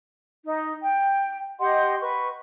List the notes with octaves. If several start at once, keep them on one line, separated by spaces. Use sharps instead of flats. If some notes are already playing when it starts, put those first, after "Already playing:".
D#4
G5
G4 D#5 F#5 C6
B4 C#6